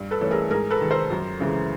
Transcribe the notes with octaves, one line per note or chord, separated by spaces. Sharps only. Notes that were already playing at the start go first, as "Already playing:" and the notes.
Already playing: G2
A4 B4
E3 A3 C#4
G#4 A#4
G#2 G#4 A#4
A4 B4
D#3 G#3
A#4 C5
F#2
C#3 E3 G#3